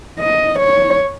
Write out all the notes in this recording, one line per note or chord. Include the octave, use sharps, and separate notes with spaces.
D#5
C#5